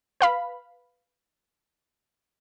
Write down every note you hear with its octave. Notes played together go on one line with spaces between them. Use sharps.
B4 F5 B5